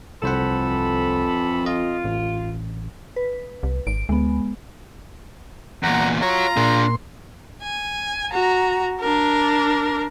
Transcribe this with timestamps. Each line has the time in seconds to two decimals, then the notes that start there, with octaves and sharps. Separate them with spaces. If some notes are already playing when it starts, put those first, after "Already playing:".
0.23 C2 F2 E3 A4 C5 F#5 B5
1.66 F4 D#5
2.04 A1
3.16 B4
3.63 C2
3.87 G#1 D7
4.09 D2 G#3 B3
5.83 E2 A#2 F#5 A#5
6.22 F4 F#4 C#5 A#5
6.57 A#2 D4 G#4 C6
7.63 G#5
8.31 F#4 A#5
9.00 D4 A#4